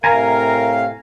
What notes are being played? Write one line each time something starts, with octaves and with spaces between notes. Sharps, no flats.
A2 C3 A#4 F5 G#5 A#5